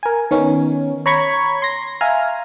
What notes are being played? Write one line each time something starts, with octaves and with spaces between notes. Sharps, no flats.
A#4 G#5
D#3 B3 C#4
C#5 A#5 B5 C#6 G#6
C6 A#6
E5 F5 G#5 A#5 F6